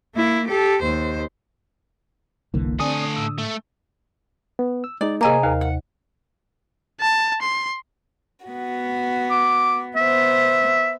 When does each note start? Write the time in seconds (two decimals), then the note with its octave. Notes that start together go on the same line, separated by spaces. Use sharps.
0.15 A#3 E4
0.48 G4 A4
0.82 D#2 C5
2.54 F#1 C2 D3 E3 A#3
2.80 D3 A3 C4 D5 G#5 D#6
3.16 A2 E6
3.39 A3
4.59 B3
4.84 E6
5.01 G#3 D#4 D5
5.21 C3 A#3 G#4 D#5 G#5 A#5 D6
5.43 D#2 A#4 F5
5.61 F#5
7.01 A5
7.42 C6
8.46 B3 F#4
9.31 D6
9.96 B3 C5 E5